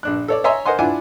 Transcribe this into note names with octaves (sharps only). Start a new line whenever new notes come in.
A#1 D4 F#6
A4 C#5 D5
C#5 D#5 E5 G#5 A#5 C6
A#4 C5 D#5 F#5 G#5 C6
D4 E4 F4 F#5 G#5 D6